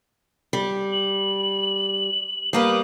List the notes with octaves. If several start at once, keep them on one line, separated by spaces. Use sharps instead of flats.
G3
F#7
G3 A#3 B4 D#6